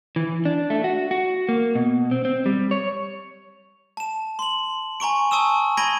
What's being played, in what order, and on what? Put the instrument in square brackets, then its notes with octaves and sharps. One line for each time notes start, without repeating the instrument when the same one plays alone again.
[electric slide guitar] E3
D4
A3
F#4
F#4
A#3
B2
C4
C4
G3
C#5
[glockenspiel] A5 E7
C6 F#7
G#5 A#5 C#6 D7
G#5 A5 C#6 D#6 E6 E7
B5 G#6 A#6 D7 D#7 G7